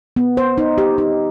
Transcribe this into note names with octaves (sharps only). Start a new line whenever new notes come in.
B3
C5
D#4
G4
D#4